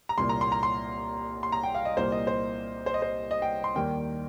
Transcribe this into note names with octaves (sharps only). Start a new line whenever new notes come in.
A#5
C2 A#2 A#3 C6
A#5
C6
A#5
C6
C6
A#5
G5
F5
D#5
C2 A#2 G3 A#3 C5
D#5
C5
C5
D#5
C5
D#5
G5
C6
D#2 D#3 G3 A#3 G5